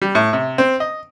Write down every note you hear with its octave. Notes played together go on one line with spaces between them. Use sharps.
G3
A2
C3
C4
D#5